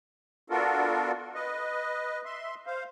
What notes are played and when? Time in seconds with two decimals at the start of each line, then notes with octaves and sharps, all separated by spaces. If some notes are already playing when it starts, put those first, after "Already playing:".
0.50 B3 D4 F4 F#4 A4 A#4
1.35 B4 D#5
2.25 E5 C6
2.66 C5 F5